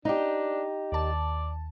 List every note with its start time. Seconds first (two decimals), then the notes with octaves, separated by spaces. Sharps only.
0.05 D4 D#4 G4
0.92 D#2 D5 A5